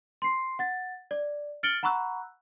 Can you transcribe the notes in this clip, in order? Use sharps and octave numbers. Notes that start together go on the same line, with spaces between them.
C6 C7
F#5 A6
D5
F6 A6 C#7 D7 F#7 G7
F#5 A#5 B5 C#6 E6 F#6